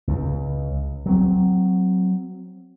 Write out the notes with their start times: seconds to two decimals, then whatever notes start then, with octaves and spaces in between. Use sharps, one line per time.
0.07 C#2
1.06 F#3 C4